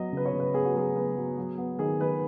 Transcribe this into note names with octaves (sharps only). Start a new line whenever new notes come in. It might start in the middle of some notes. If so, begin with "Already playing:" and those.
Already playing: F#3 B3 D#5
C#3 B4
C#5
C#3
B4
B3 G#4
F#4
F#3 G#4
B3
F#3
F#3
B3
D#3 G#4
D#3 B4